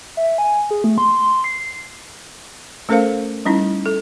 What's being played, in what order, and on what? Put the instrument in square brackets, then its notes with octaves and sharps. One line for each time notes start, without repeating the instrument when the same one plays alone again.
[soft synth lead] E5
G#5
G#4
A3
C6
C7
[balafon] A3 C#4 A4 A#4 C5 F5
G3 C#4 D#4 E4
A4